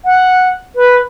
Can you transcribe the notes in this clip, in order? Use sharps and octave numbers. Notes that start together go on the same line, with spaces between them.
F#5
B4